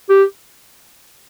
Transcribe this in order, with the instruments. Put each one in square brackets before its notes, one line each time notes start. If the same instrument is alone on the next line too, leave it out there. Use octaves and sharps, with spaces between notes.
[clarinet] G4